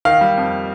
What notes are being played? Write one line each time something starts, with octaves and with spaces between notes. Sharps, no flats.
D#3 F5
G3
F2